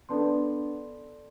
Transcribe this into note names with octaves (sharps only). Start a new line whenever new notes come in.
B3 D4 A4 D5 A5 C6